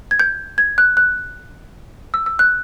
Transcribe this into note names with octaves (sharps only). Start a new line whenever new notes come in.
G#6
G6
G#6
F#6
F#6
E6
E6
F#6